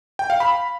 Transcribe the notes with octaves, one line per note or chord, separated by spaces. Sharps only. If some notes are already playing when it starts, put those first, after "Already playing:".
G5
F5
B5